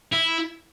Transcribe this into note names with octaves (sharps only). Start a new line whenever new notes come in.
E4